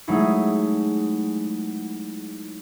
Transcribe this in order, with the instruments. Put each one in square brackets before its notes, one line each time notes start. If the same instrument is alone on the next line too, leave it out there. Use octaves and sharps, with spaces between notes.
[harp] F#3 G#3 A3 D#4 E4 G#4